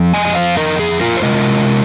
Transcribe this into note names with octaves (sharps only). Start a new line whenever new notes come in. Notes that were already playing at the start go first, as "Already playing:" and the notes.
Already playing: F2 F3
D#5 G#5
D#5
C5 F5
A#4 D#5
G#4
F4 A#4
C5
C3 G#3 F4 A#4 D#5